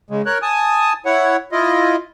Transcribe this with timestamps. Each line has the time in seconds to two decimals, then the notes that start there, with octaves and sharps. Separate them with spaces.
0.10 C#3 G#3
0.26 A#4 C#5 F#6
0.42 G#5 A5 D#6
1.06 E4 C#5 F#5
1.52 E4 F4 D#5